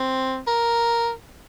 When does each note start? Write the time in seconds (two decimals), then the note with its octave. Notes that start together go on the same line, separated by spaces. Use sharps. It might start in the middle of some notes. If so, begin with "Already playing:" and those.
Already playing: C4
0.47 A#4